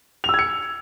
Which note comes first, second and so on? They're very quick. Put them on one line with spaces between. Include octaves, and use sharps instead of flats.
F7 E6 G#6 C#7